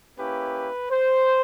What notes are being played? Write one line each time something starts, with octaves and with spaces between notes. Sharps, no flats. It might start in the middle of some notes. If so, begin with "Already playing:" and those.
A#3 C#4 E4 G4 B4
C5